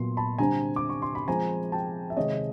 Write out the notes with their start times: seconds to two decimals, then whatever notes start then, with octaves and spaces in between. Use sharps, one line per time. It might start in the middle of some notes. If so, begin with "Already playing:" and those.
Already playing: A#2 F#3 B3 C6
0.17 A5 B5
0.38 D3 G3 C4 G#5 A#5
0.76 D6
0.89 C#6
1.02 C6
1.15 B5
1.28 F3 G#3 C4 G#5 A#5
1.72 G5 A5
2.10 E5
2.16 C3 D#3 G#3 C#5 D#5